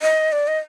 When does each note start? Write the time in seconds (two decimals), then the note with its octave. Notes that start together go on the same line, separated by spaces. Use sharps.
0.02 D#5
0.32 D5
0.47 D#5